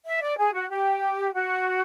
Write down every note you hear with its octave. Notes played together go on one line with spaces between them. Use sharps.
E5
D5
G#4
F#4
G4
F#4